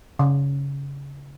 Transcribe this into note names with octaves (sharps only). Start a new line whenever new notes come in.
C#3